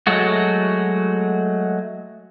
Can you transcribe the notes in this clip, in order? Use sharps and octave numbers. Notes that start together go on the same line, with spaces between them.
F#3 G#3 A3 F#4